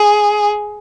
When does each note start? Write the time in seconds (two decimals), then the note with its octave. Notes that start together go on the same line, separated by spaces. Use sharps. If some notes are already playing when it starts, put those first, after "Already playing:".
Already playing: G#4